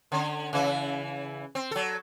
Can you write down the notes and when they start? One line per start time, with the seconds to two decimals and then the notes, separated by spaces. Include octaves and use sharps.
0.12 D3 C#4
0.53 C#3 E3 E4
1.55 C4
1.71 F#3 A4